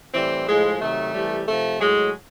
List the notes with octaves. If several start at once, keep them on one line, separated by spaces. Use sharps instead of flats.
A2 E3 G3 C4
A2 F3 G#3
C3 D#3 F#3 A3
C3 E3 G3
C3 F3 A3
A2 F#3 G#3